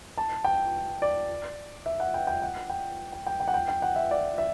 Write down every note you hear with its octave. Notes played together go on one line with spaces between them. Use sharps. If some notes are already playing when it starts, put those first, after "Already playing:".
A5
G5
D5
E5
F#5
G5
G5
F#5
G5
G5
G5
G5
F#5
G5
G5
F#5
E5
D5
E5